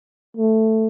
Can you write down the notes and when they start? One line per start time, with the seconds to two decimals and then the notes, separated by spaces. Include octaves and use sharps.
0.37 A3